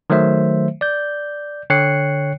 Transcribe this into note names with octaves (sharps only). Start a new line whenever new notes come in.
D#3 F#3 A3 C5 E5
D5 G6
D3 C#5 G5 F#6 C7 C#7